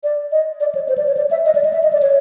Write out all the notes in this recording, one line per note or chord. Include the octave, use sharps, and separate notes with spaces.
D5
D#5
D5
C#5
C5
D5
C#5
D5
E5
D#5
D5
D#5
E5
D#5
D5
C#5